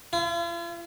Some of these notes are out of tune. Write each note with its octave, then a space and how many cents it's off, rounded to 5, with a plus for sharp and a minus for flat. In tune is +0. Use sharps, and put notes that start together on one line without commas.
F4 -45